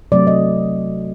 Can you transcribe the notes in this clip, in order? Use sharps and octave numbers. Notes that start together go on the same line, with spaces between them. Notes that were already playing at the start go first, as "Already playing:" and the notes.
C3 F#3 A3 C4 D5
D#5